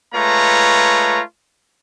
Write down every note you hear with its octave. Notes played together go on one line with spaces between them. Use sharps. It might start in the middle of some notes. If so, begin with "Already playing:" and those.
G#3 A3 F4 B4 C#5 A#5